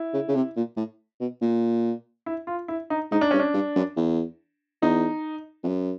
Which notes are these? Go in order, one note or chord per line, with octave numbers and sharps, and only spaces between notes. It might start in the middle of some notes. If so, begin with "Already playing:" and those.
Already playing: E4
C#3
C#3
C3
A#2
A2
B2
A#2
E4
F4
E4
D#4
G#2 D#4
D4
G2 C#4
D4
G2
F#2
E2
E2 D#4
F2
F#2